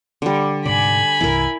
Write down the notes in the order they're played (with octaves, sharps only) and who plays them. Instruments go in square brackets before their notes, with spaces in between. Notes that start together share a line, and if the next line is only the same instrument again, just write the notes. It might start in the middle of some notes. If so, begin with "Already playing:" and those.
[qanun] D3 G3
[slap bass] G#2 C3 [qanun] D5 [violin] G#5 B5
[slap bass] C2 G2 E3 [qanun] E4 A#4